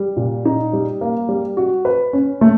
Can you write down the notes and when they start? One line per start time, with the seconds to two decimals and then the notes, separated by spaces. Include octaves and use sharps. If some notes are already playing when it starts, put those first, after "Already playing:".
Already playing: G3
0.17 A#2
0.45 D#4
0.73 G3
1.01 A#3
1.29 G3
1.57 F#4
1.85 B4
2.13 C#4
2.41 A3